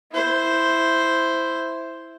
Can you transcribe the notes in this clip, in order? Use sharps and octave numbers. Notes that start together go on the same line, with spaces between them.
E4 C5